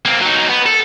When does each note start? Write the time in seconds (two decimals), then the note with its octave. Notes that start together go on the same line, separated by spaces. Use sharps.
0.05 A#3 C4
0.22 F#3 D#4
0.49 B3
0.66 A4